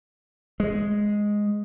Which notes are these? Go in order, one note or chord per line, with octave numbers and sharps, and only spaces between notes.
G#3